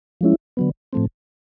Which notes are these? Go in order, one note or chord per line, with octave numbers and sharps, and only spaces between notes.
F3 G#3 C#4 E4
D3 F#3 B3
A2 F3 A3 C4